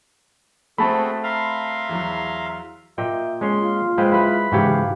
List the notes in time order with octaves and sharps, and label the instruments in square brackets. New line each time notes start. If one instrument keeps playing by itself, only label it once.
[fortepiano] A3 C4 [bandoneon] F#4 G#4 A4 [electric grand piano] A5 B5
[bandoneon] E5 F5 C6 [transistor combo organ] A#5 F6
[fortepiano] E2 F#3
[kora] A#2 D#5 G5 [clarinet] E5
[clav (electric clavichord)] G#3 C#4 [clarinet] C6
[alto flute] F4
[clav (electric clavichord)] G#3 [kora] C4 B4 C5 [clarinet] F5
[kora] E4 B4 [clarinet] B5
[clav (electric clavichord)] G#2 C#3 E3 [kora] F#4 G4 C#5 [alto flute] F5